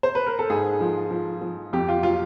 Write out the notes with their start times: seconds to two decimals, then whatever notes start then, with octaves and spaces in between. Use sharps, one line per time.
0.03 C5
0.15 B4
0.27 A#4
0.39 A4
0.50 G#2 G#4
0.80 F3
1.11 F3
1.41 F3
1.73 F2 G4
1.89 F4
2.03 F#3 F4